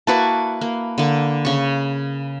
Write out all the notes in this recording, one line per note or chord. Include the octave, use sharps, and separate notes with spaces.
A#3 E4 F#4 B4 A5 C#6
A#3
D3 A#3
C#3 C#6